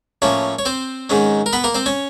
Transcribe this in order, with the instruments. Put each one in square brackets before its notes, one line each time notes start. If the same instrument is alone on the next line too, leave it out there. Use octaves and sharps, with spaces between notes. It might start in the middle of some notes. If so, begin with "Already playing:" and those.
[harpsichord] A2 F3 A#3 C#4 C#5
C#5
C4 C5
G#2 D#3 G#3 C#4
A#4
B3 B4
A#3 A#4
C4 C5
C#4 C#5